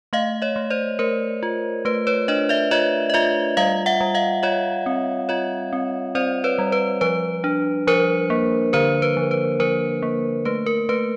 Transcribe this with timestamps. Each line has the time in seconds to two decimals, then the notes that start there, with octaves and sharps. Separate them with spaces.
0.13 A3 D#5 F5
0.42 C#5 D#5
0.56 A3
0.70 C5 D5
0.99 A3 A#4 C5
1.43 F4
1.85 A3 B4
2.07 B4 C#5
2.28 D4 C#5 D#5
2.49 D5 E5
2.71 F4 C#5 D#5
3.10 D#5
3.14 F4 D5 E5
3.57 G3 D#5 F5
3.86 E5 F#5
4.01 G3
4.14 D#5 F5
4.43 F4 C#5 D#5
4.86 C4
5.29 F4 C#5 D#5
5.73 C4
6.15 C4 C5 D5
6.44 B4 C#5
6.59 G3
6.72 B4
7.01 F3 B4
7.44 D4
7.87 F3 A#4 C5
8.30 A#3
8.73 D3 A#4 C5
9.02 B4
9.17 F3
9.31 B4
9.60 F3 A#4 C5
10.02 A#3
10.45 A3 B4
10.66 A#4
10.89 A3 B4